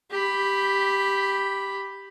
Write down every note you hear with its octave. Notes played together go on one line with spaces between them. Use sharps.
G4 B5